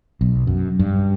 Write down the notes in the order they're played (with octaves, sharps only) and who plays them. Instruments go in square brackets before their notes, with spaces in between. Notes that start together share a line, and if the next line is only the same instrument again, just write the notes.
[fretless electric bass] B1
F#2
G2